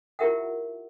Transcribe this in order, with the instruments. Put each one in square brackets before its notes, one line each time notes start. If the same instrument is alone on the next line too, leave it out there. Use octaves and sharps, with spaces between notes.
[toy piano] E4 F4 G4 A#4 E5 F#5